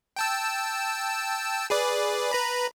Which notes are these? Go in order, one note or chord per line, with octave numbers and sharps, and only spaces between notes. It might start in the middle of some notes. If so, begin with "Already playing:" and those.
G5 A5 E6
G#4 B4 D5
B4 A#5 B5